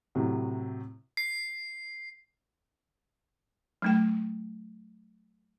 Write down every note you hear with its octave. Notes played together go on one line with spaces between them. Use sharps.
A2 C3 F#3
C7
F#3 A3 G5